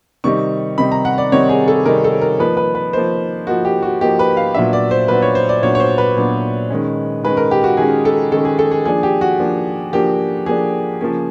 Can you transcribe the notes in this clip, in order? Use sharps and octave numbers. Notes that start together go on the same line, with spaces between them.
C3 D#3 G3 C4 D#4 C#6
C3 D#3 G3 C4 D#4 B5
A#5
F#5
D5
C3 D#3 G3 C4 D#4 C#5
G#4
A4
C3 D#3 G3 C4 D#4 A#4
A4
A#4
F3 A#3 D#4 B4
B4
B4
F3 A#3 D#4 C5
F3 A#3 D#4 F#4
G4
F#4
F3 A#3 D#4 G4
B4
F5
A#2 F#3 B3 D4 E5
D5
C5
A#2 F#3 B3 D4 B4
C#5
C5
D5
A#2 F#3 B3 D4 C#5
C#5
C5
B4
A#2 F#3 B3 D4
D#3 G#3 C#4
D#3 G#3 C#4 B4
A#4
G4
F#4
D#3 G#3 C#4 G#4
A4
D#3 G#3 C#4 A4
G#4
A4
G#4
F3 A#3 D4 G#4
G4
F#4
F3 A#3 D4
F3 A#3 D4 G4
F3 A#3 D4 G#4
C#3 F3 A#3 C#4